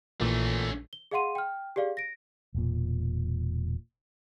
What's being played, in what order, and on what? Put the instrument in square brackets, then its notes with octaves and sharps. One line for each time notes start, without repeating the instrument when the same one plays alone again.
[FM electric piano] A#1 [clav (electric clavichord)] A#2 E3 [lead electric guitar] A3 C#4
[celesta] G7
G#4 D#5 F5 F#5 C6 D#7
G5 F6
G4 G#4 D5 F5
A#6 D7
[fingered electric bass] E1 A#2